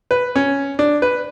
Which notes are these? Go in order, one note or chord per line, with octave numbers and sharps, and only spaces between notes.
B4
C#4
D4
B4